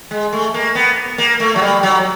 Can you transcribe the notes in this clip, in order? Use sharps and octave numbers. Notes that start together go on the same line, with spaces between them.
G#3
A3
A#3
B3
A#3
A3
F#3
G3
F#3